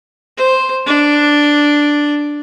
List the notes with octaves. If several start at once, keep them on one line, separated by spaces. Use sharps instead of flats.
C5
D4